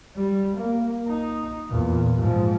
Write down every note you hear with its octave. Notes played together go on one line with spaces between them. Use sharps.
G3
A#3
D#4
E2 A#2
G#2 F3